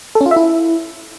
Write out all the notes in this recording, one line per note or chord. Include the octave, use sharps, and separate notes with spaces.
A4
C#4
F4
E5
E4